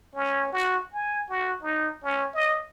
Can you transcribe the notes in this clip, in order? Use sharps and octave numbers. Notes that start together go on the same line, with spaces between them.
C#4
F#4
G#5
F#4
D#4
C#4
D#5